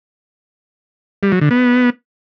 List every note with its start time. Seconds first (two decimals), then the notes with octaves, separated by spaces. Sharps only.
1.23 G3
1.32 F#3
1.41 D3
1.51 B3